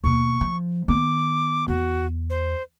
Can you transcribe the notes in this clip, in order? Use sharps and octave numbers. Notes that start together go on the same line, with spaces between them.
D#2 B2 C#6
F3
D#3 B3 D6
E2 F#4
C5